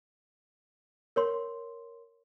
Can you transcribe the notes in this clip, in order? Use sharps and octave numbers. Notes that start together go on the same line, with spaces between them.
A#4 C#5 C6